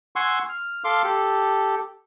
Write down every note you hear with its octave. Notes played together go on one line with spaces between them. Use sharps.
F#5 G#5 C6 C#6 E6
F6
A4 F5 C6 D6
G4 A4